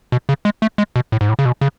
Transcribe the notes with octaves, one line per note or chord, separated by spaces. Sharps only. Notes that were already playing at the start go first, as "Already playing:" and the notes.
B2
C#3
G#3
A3
G#3
B2
A2
G#2
A2
C#3
B2
C#3